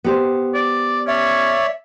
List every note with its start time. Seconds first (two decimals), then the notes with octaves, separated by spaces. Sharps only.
0.04 B3 G4 C5
0.54 D5
1.08 C#4 C#5 D5 E5